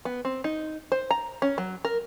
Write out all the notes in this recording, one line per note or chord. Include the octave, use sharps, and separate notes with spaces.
B3
C4
D#4
C5
A#5
C#4
F#3
A#4